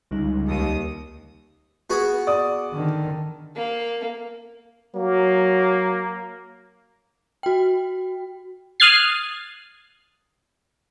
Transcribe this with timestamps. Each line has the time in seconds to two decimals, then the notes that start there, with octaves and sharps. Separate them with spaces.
0.11 C#2 D3 G3 D#4
0.46 D#2 D#6
1.90 B3 F#4 G#4
2.27 D5 D#6
2.72 D3 D#3
3.55 A#3
4.95 F#3 A#3
7.43 F#4 G5
8.80 D#6 F6 F#6 G#6 A6 C7